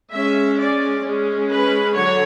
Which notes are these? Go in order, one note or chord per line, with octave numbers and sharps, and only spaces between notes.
G#3 C#4 E5
D5
G#3 C#4
B4
D3 F#3 C#5